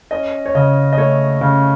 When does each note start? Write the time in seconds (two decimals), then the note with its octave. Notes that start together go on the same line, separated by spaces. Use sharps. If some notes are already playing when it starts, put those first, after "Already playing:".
0.11 C#4 D#5
0.46 C#5
0.55 C#3 D#5
0.93 D#5
0.98 A3 C#5
1.41 C#3